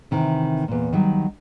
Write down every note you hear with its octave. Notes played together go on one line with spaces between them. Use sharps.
C3 D#3 E3
E2 A#2
D#3 F#3 G3